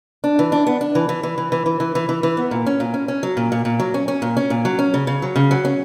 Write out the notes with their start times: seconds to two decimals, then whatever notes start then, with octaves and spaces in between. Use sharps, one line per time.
0.24 D4
0.39 E3
0.52 D4
0.67 B3
0.81 D4
0.95 E3
1.09 E3
1.23 E3
1.38 E3
1.52 E3
1.66 E3
1.80 E3
1.95 E3
2.09 E3
2.23 E3
2.37 B3
2.51 A#2
2.66 C#4
2.80 A#2
2.94 C#4
3.08 C#4
3.23 F#3
3.37 A#2
3.52 A#2
3.65 A#2
3.80 F#3
3.94 C#4
4.08 C#4
4.22 A#2
4.37 C#4
4.50 A#2
4.65 F#3
4.79 C#4
4.94 C#3
5.07 C#3
5.22 F#3
5.36 C#3
5.51 F#3
5.65 C#4